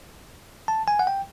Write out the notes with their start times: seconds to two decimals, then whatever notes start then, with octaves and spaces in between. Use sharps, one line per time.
0.68 A5
0.88 G#5
0.99 F#5
1.07 G5